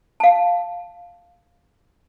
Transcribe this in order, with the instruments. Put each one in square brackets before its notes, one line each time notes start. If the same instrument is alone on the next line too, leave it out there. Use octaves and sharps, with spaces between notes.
[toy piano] F5 A5